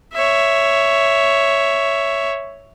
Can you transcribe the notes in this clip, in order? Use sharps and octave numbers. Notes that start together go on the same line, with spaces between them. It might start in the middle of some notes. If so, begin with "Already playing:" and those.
C#5 E5